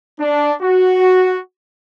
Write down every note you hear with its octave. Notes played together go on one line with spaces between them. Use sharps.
D4
F#4